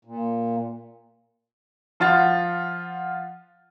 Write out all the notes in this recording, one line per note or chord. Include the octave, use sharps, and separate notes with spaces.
A#2
F3 F4 F#5 A6